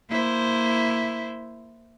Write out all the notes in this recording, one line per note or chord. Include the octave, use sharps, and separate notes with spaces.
A#3 E4 C5